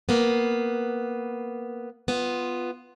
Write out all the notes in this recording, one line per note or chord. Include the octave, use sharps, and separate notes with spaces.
A#3 B3
B3 F4